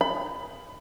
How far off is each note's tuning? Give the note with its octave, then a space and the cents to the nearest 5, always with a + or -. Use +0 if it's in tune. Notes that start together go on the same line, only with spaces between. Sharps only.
B5 +20